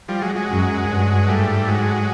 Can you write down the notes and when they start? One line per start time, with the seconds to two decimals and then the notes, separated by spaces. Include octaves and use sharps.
0.08 F3 G3
0.22 F#3 G#3
0.35 F#3 G#3
0.48 F#2
0.88 G2
1.28 G#2 G3 A3
1.68 F#3 G#3